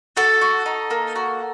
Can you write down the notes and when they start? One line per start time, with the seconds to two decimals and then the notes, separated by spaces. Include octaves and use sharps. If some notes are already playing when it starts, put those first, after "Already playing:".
0.17 F#4 A4
0.41 F#4
0.66 D#4
0.91 A#3
1.16 F#4